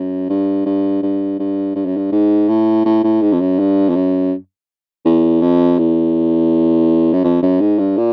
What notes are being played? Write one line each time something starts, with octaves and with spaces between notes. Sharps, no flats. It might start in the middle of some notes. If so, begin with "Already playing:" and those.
Already playing: F#2
G2
G2
G2
G2
G2
F#2
G2
G#2
A2
A2
A2
G#2
F2
F#2
G2
F2
F#2
E2
F2
E2
F#2
F2
F#2
G#2
G2
A#2